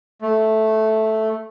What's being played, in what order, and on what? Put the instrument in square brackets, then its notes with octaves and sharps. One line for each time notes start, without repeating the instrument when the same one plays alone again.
[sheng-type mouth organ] A3